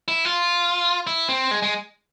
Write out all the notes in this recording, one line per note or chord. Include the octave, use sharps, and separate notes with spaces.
E4
F4
E4
C4
G#3
G#3